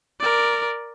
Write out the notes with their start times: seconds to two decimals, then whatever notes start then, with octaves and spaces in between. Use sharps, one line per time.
0.20 A#4 D5